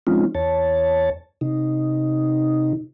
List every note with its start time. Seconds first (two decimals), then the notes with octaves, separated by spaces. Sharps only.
0.07 F3 G#3 C4 C#4 D#4 F4
0.35 E2 C#5 A5
1.41 C3 D#4